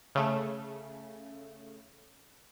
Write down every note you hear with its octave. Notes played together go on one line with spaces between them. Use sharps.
C#3 A3